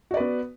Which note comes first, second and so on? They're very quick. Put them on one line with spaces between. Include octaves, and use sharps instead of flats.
F#4 D5 B4 B3